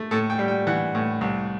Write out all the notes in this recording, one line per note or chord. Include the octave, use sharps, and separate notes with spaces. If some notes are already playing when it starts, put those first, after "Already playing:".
Already playing: A3
A2 A4
G5
G3
G5
E3 F#5
A2
C2